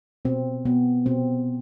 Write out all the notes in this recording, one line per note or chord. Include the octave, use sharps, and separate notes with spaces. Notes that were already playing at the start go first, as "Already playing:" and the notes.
B2 C4
B2 B3
B2 C4